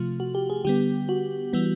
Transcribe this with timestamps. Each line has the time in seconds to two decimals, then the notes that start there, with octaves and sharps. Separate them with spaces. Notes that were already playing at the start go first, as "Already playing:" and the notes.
Already playing: C3 F3 A3 F4
0.20 F#4
0.35 G4
0.50 G#4
0.65 D3 G3 B3 G4
1.09 F#4
1.53 E3 G3 B3